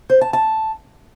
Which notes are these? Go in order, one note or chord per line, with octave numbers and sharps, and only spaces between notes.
C5
A5
A5